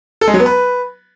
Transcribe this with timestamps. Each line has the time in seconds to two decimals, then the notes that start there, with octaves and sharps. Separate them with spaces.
0.21 A4
0.28 G#3
0.34 F#3
0.40 B3
0.46 B4